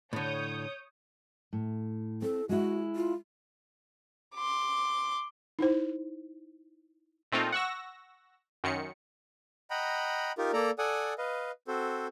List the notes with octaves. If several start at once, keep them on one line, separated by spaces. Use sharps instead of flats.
A2 D3 C#5 D#6 G6
A2
C4 A4
G#3 E4 F#4
F4
C6 D6
D#4 E4 C5
A#2 A3 C4 D#4 F4
F#5 C#6 E6 A#6
F#2 D#3 C#7
D#5 F#5 G5 A#5 B5
D#4 F4 G4 A#4
A#3 A4 D5 A#5
A4 D5 F#5 G#5 D#6
B4 D#5 F5
C4 F#4 A4 C5